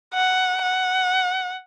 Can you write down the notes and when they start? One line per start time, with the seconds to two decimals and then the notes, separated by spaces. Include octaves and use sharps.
0.14 F#5
0.63 F#5